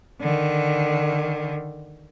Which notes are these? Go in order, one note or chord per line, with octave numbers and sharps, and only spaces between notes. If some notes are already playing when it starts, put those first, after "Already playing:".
D3 D#3